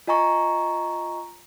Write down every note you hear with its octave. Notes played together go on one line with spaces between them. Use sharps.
F4 D#5 G#5 A#5 C#6